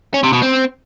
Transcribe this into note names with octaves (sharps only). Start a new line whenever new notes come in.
C#4
C3
B2
C4